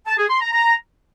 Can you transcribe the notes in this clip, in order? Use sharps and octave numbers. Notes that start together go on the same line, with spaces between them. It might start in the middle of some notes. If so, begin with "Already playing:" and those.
A5
G#4
C6
A#5
A#5